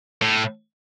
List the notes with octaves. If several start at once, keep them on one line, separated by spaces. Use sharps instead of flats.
A2